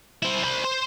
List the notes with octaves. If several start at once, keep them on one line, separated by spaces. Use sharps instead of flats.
E4 C5
C5 B5
C5